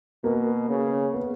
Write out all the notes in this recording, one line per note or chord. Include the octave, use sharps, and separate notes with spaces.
B2 A#3
C#3
B3